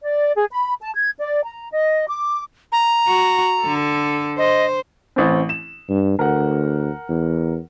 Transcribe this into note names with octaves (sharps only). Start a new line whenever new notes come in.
D5
G#4
B5
A5
G#6
D5
A#5
D#5
D6
A#5
F#4
D3 A4
C5 D#5
A1 C4
E7
G2
D2 A#4 F#5
E2